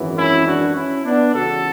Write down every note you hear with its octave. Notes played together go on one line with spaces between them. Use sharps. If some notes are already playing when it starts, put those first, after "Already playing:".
Already playing: G#1 F#2 E3
C#4 E4
D4 F#4
C#4 E4
B3 D4
C#2 C#3 E3 F#4 A4